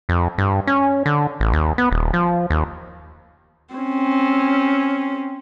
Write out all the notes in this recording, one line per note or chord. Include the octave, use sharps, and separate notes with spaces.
F2
G2
C#4
D3
A1
D#2
B3
D#1
F3
D#2
C4 C#4